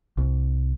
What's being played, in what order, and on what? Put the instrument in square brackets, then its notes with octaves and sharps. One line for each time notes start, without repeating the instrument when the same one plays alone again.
[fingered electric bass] C2